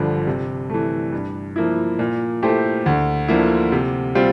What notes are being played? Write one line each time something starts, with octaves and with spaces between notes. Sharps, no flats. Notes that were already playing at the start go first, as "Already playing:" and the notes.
Already playing: G1 G2 D3 F3
C3
E3 A3
G2
F3 A#3 E4
A#2
A3 E4 G4 C5
D2
D3 F3 A#3 E4
C3
G3 C4 F4